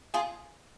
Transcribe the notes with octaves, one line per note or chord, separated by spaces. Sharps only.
F4 G#4